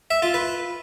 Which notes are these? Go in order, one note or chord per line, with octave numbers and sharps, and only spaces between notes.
E5
F4
B4